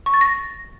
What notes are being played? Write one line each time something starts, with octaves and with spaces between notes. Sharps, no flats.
C#6
A6
A#6